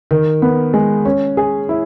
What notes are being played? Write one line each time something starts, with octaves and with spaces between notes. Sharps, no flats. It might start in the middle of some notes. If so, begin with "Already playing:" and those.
D#3
B3
G#3
C#4
G#4
E4